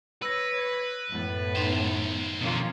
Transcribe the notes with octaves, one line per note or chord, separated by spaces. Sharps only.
B4 C#5 E6 A#6
F#2 A2 B3
D#3 D#4 C5 C6 F7
F2 B2 A#3 C#4 F4